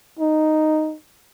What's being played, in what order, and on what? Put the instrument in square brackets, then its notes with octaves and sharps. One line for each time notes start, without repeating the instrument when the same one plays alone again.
[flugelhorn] D#4